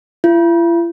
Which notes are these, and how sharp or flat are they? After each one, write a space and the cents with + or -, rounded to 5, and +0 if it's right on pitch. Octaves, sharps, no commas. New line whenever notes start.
E4 +45